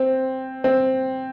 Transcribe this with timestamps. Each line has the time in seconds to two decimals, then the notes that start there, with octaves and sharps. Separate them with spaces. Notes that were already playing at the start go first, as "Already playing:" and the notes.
Already playing: C4
0.64 C4